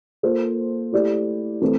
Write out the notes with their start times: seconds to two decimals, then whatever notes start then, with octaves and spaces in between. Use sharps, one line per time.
0.23 A#3 F4 A4 C5
0.92 A3 E4 G4 D5
1.61 E3 A3 C4